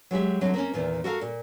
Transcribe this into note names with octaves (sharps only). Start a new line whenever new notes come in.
F#3 G#3 G4 E5
D3 F#3 C4
A#3 C4 C#4
E2 A#2 D#3
F#4 A4 A#4 F5
A#2